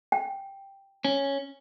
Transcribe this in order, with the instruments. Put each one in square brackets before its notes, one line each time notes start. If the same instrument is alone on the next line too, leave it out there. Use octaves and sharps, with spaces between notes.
[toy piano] G5
[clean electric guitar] C#4